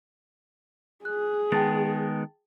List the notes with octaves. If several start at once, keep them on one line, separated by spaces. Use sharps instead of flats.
G#4 F#6
D#3 G#3 B3 G5 A5 A6